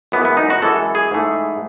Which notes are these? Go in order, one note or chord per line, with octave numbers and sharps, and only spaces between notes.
F#2 E3 G#3 B3
B3
D#4
F#4
F#2 E3 G#3 A4
G#4
G#2 E3 A3